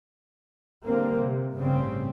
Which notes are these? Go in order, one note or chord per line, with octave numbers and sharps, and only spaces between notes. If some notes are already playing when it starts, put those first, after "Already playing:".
D3 G3 A#3 C4
C3
A1 G2 C#3 G3 A3 C4